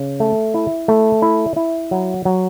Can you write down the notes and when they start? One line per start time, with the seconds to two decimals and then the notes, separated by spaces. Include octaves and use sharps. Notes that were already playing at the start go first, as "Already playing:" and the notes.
Already playing: C#3
0.20 A3
0.54 E4
0.88 A3
1.22 E4
1.56 E4
1.91 F#3
2.25 F#3